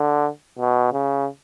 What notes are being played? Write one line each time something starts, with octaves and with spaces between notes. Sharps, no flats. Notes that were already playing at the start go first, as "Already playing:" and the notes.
Already playing: D3
B2
C#3